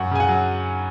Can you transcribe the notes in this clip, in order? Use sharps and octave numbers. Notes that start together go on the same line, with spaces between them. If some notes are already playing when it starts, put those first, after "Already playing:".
Already playing: F#2 F#5
C#3 G#5
F#5
F#3